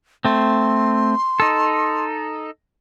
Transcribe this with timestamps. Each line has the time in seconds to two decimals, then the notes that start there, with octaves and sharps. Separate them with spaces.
0.25 A3 C4 C6
1.40 D#4 A4